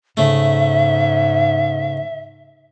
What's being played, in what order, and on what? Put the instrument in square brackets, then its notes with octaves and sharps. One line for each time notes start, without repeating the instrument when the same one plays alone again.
[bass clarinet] G#2 [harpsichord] C#3 A3 [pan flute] E5